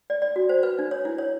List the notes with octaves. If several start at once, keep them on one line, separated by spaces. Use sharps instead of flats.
D5
D5
F#4
C5
B4
D4
C#5
E4
C#5